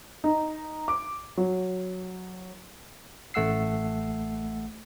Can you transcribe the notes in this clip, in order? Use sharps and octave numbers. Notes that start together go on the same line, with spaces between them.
D#4
D6
F#3
A1 A3 F#5 E6 C7